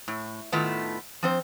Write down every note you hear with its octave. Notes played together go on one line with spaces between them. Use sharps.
A2
A2 D#3 A3 B3 E4 F4
F3 C4 C5